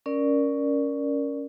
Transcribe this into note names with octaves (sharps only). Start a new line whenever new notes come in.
C#4 A#4 D5